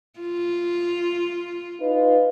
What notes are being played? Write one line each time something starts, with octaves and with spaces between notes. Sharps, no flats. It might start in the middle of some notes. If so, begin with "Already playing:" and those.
F4
D#4 F4 B4